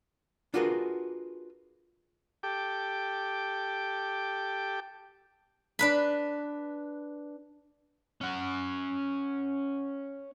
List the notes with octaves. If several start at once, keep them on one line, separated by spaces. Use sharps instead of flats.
D4 F4 F#4 G#4 A#4 B4
G4 A4 G5 D6
D4 B4 B5
C#4 F#5